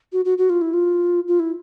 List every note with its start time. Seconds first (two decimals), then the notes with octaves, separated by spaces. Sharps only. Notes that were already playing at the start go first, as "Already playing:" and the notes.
0.13 F#4
0.25 F#4
0.38 F#4
0.49 F4
0.61 E4
0.73 F4
1.28 F4
1.39 E4